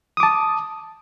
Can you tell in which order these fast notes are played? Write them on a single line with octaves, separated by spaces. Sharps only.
D#6 D6 A5